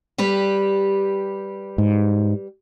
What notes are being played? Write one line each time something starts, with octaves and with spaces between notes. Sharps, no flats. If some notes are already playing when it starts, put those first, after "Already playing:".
G3 G4 B4
G#2